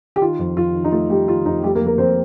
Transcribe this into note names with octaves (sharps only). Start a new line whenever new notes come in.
G4
D#3 F4
F2
F2 F4
D#3
D#4
A3 F4
G3 A3 G4
D#3 F4
F2 D#4
G3 A3 G4
A#3 A#4
F2
A#3 A#4
F2 C4 C5